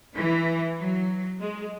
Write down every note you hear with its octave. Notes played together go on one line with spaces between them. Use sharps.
E3
F#3
G#3